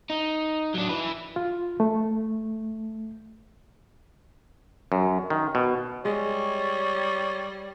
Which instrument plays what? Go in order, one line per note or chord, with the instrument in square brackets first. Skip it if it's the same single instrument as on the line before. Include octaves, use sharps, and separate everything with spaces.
[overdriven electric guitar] D#4
F#3 D4
E3 B4
[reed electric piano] F4
A3
[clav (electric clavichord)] F#2
D#3
B2
[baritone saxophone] G3 [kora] G#3 [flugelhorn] C#5